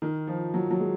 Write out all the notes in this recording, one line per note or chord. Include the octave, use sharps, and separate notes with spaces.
D#3
F3
F#3
F#3
G#3